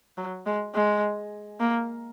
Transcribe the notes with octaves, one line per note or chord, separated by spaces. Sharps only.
F#3
G#3
G#3
A#3